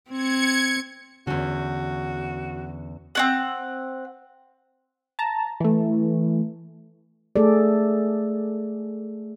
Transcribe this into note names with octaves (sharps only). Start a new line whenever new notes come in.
C4 G#6 C#7
E2 D3 C#4 F#4
C4 C#4 F#5
A5 A#5
E3 A3
A3 G#4 A4 D5